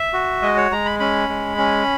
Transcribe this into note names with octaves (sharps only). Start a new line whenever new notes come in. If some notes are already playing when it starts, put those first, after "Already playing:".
Already playing: E5
F#4
G#3 D#5
C#5
G#3 A#5
B5
C#4 B5
G#3
C#4